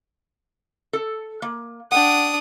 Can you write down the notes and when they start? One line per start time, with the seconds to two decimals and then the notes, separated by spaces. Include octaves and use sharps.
0.93 A4
1.42 A#3
1.92 D4 F#5 G5 D#6